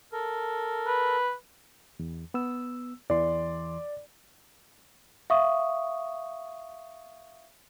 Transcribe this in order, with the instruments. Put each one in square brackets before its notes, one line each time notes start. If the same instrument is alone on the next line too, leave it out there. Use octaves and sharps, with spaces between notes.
[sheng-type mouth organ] A4 A#4
[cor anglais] B4
[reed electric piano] E2
B3 E6
[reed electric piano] E2 E3 C6 [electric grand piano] D5
[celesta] E5 F5 C#6 D#6